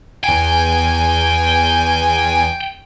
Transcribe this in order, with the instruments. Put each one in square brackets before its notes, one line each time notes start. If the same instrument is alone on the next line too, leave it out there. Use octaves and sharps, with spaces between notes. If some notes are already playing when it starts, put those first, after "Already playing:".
[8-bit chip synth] E2 G#5 [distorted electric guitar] G5